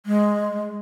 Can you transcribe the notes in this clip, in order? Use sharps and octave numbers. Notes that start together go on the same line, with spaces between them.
G#3